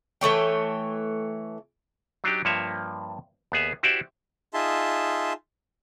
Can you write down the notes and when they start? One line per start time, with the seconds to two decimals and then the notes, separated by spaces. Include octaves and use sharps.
0.21 E3 A3 C#5 G5
2.24 F#3 D4 D#4 G4
2.45 G2 F3 A#3 C#5 E5
3.52 D#2 B3 G#4 E5
3.83 E4 F#4 G4 C5 D5 E5
4.54 D#4 F4 G#4 E5 A5 C6